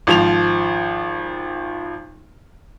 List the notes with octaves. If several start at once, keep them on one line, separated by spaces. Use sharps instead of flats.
G#1 F3 F7